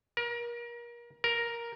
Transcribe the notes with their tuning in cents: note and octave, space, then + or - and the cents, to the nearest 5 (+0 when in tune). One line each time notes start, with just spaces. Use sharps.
A#4 +30
A#4 +5